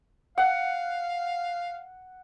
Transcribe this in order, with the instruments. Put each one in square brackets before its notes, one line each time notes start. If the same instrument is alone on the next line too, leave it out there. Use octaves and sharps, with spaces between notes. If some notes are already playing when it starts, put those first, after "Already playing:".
[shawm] F5 [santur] F#5